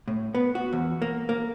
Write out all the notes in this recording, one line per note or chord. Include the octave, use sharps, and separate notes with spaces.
A2
B3
F#4
E2
A#3
A#3